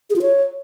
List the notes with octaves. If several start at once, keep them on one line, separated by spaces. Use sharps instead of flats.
G#4
F4
C#5